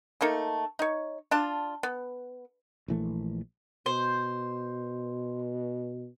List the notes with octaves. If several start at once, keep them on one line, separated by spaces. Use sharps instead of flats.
A3 A#3 D#4 A4
D#4 C#5
D4 F4 A5
B3
A#1 E3 A3
B2 C5